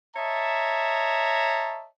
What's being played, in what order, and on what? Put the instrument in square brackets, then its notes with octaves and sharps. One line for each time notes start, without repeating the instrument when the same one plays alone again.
[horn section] C#5 D#5 E5 A5 A#5